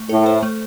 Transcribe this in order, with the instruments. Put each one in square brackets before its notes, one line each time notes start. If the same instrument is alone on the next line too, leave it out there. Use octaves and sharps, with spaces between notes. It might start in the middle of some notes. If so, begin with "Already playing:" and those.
Already playing: [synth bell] A3
[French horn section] A2 [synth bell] A4
[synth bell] C5
A3